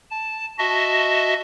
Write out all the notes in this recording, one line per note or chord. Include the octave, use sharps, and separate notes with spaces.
A5
F#4 D#5 E5 A5